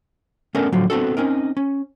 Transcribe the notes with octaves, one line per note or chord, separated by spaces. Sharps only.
A3 B3 C#4 D4 A4 A#4
A2 D3 F3 F#3
B3 C4 D4 F#4 A4
C4 C#4 D#4 A#4
C#4